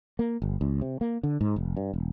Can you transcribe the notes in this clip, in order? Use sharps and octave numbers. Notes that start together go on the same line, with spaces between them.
A#3
G1
C#2
C3
A#3
D3
G#2
F1
G2
E1